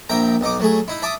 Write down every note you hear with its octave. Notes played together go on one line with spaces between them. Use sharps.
A#1 E5 G5 A#5
B1 D#4 D6
F#3 A3 G#4
D#4 E4
E5 A5 D6 D#6